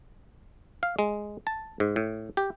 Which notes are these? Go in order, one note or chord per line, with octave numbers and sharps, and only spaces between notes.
F5
G#3
A5
G#2
A2
G4